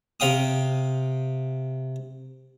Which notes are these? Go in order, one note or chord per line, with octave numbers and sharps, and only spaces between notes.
C3 F5 G5 D#6